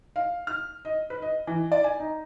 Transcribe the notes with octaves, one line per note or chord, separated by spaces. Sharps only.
F5
F6
D#5
B4
D#5
E3
D5
G#5
D#4